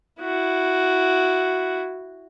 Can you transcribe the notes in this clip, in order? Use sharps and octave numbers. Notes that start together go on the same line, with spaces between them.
E4 F#4